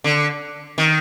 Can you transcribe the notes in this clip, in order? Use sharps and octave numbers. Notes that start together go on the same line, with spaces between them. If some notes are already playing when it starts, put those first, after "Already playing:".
D3
D#3